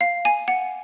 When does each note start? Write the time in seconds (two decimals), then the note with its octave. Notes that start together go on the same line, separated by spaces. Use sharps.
0.01 F5
0.25 G#5
0.48 F#5